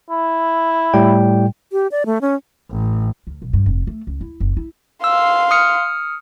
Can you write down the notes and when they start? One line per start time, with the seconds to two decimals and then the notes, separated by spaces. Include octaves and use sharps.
0.10 E4
0.94 A2 G3 G5
1.72 G4
1.92 D5
2.06 A3
2.21 C#4
2.70 A1
3.27 D2
3.42 B1
3.53 G2
3.66 F1
3.87 A3
4.07 C#2
4.21 E4
4.40 F#1
4.57 E4
5.04 F5 C6 E6
5.51 D#6 F6 C#7